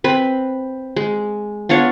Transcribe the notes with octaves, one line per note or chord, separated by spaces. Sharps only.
C4 B4
G#3
B3 D4 F4 C#5